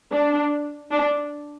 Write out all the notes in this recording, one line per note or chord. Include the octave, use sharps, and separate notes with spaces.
D4
D4